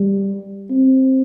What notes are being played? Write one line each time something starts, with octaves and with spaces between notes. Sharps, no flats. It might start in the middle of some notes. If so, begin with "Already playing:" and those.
Already playing: G3
C4